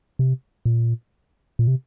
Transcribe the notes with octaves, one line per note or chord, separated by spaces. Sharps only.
C3
A#2
A#2
C3